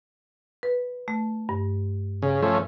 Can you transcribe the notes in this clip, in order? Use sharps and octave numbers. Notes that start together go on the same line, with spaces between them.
B4
A3
G2
C#3
F3 A3 C#4